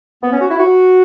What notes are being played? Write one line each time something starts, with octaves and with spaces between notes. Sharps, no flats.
B3
C#4
F#4
E4
F#4